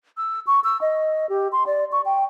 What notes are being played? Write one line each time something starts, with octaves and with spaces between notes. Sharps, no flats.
E6
C#6
E6
D#5
G4
C6
D5
C#6
G5